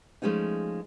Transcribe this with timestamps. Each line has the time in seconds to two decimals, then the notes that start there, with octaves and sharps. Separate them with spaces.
0.22 F3 G#3 A3 C#4 D#4